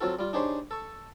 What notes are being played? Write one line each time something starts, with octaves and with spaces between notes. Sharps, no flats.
F#3 C4 F4 F#4 A4
G3 F4
D4 D#4 G4 G#4 C5 C#5
A4 C#6